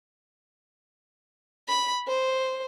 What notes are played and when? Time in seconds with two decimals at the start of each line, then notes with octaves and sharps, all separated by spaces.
1.68 B5
2.08 C5